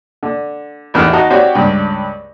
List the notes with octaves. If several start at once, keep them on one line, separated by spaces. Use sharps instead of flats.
D3
A1 E2 D#3 F6
D#4 F#4 A5 A#5
C4 F#4 G4 C#5 D5
C#2 G2 G5